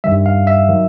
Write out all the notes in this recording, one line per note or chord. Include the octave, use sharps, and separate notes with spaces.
G2 D#3 G3 E5
F5
E5
D#3 F#3